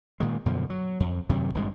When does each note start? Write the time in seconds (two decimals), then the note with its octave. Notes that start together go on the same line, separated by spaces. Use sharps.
0.20 A#2 D#3 G#3
0.46 F#2 B2 D3 F3
0.70 F#3
1.00 F2
1.29 F#2 C3 D#3 F#3
1.55 G#1 G2 A#2 G#3